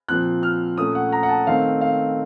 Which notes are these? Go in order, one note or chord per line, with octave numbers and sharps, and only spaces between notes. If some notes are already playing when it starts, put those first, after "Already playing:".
A#2 F3 C4 F#6
F6
A#2 A3 C#4 D#6
F#5
A#5
F#5
A5
D#3 A3 C4 F5
F5